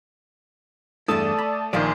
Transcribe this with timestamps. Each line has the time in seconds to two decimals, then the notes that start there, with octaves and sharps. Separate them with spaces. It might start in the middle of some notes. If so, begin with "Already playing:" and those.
1.08 E2 G2 A3 E4 A4 D5 A5 D#6
1.39 B5
1.73 A#1 A#2 D#3 F3 D5 G#5 C6